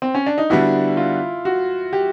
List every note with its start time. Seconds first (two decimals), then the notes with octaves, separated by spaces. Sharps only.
0.02 C4
0.15 C#4
0.26 D4
0.38 D#4
0.50 D3 G3 B3 D4 E4 F#4
0.97 F4
1.45 F#4
1.93 G4